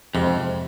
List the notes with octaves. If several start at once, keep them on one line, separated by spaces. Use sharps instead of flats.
F2 G#2 C3